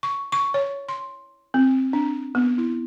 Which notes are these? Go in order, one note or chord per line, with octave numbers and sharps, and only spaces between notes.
C#6
C#6
C#5
C6
C4
D4
B3
E4